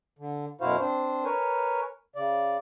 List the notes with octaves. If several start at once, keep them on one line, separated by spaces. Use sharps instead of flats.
D3
F#2 B2 E4 F#4 C5 F5
C4 D4 C5
A#4 B4 C#5 G#5
C#3 D5